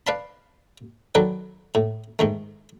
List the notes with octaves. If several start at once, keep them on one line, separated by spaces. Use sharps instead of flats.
B4 D5 F5 A5 B5
D#3 F#3 A4 B4 D5
A2
G#2 D#3 A3